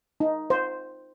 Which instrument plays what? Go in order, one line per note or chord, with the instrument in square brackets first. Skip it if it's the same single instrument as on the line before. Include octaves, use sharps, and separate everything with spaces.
[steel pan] D#4
C5